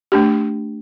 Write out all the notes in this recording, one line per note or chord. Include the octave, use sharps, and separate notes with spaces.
A3 D4 G4